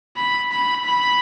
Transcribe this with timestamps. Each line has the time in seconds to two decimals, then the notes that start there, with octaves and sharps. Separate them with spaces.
0.17 B5
0.51 B5
0.85 B5